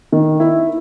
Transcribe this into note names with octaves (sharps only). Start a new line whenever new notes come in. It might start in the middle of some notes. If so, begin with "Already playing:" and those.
D#3
E4